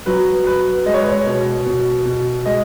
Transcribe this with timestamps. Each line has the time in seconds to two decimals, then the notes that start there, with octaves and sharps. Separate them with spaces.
0.06 F#3 B4
0.47 F#3 B4
0.86 G#3 D#5
0.94 C#5
1.01 B4
1.08 C#5
1.26 B2
1.66 B2
2.06 B2
2.45 G#3 D#5